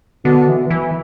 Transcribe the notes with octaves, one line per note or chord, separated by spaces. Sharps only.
B2 D3
E3
E3